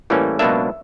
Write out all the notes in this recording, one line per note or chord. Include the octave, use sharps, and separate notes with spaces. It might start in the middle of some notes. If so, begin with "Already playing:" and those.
A2 E3 G3 A#3 C#4
C#2 B2 F#3 A#3 D4 E5